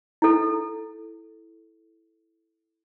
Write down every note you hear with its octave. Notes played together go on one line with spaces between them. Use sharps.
E4 A4